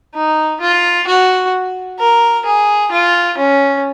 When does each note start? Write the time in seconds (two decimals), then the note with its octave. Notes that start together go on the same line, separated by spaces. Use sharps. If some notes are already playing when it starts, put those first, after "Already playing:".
0.15 D#4
0.61 F4
1.07 F#4
1.99 A#4
2.45 G#4
2.92 F4
3.38 C#4